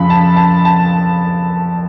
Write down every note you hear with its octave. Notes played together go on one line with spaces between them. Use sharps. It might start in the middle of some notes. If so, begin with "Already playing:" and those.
Already playing: F2 C#3 F3 B5
A5
A5
A5